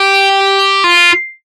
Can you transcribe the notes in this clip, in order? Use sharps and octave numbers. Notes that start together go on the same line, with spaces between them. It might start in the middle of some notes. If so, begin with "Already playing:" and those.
Already playing: G4
F4